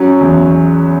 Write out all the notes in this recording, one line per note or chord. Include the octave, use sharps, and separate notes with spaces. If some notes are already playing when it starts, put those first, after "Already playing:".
Already playing: F#3 C#4
E2